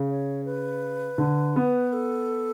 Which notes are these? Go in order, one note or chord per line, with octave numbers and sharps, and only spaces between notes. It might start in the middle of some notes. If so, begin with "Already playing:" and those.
Already playing: C#3
C#5
B4
D3
B3
A4